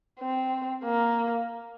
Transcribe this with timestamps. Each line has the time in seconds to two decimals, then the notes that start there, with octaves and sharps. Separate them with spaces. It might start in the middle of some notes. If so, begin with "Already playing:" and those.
0.20 C4
0.84 A#3